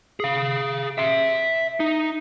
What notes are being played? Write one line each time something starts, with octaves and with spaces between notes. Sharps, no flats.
G#4 F5
E5 C6
D#4